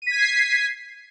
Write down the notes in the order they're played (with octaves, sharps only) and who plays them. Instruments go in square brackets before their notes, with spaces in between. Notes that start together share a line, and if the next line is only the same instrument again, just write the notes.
[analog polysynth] D#7
B6
G#6
C7